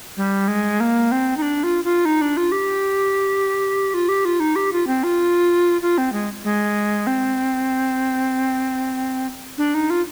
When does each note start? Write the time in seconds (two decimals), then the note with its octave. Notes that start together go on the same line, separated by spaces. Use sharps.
0.17 G3
0.48 G#3
0.80 A#3
1.12 C4
1.37 D#4
1.42 D4
1.63 F4
1.84 F4
2.05 D#4
2.22 D4
2.37 F4
2.52 G4
3.94 F4
4.09 G4
4.25 F4
4.40 D#4
4.56 G4
4.73 F4
4.87 C4
5.04 F4
5.82 F4
5.98 C4
6.12 G#3
6.44 G#3
7.07 C4
9.58 D4
9.74 D#4
9.90 F4